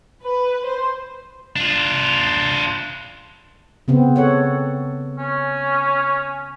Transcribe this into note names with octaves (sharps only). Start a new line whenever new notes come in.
B4
C5
D4 F4
C#3 B3 C4
A4 C#5 F#5
C#4